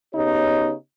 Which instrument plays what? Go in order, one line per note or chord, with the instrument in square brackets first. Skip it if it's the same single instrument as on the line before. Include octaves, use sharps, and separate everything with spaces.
[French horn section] C#3 B3 D#4 G4 C#5